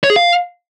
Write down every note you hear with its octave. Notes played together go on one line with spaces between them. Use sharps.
C#5
G#4
F5